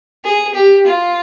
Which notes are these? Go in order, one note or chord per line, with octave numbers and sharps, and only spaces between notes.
G#4
G4
F4